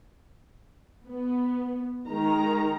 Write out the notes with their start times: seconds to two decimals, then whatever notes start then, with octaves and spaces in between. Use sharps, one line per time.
1.08 B3
2.07 D#3 G#3 D#4 A#5